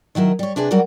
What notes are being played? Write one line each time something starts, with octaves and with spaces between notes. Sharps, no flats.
D#3 F#3 E4 A#4
G3 C#5
C3 D4 G#4 B4
F#3 G3 F#4 A#4 D5